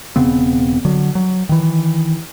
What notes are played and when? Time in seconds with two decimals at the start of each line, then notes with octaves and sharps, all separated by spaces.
0.16 E1 C#3 B3 C4
0.85 D3 F#3
1.15 F#3
1.49 D#3 E3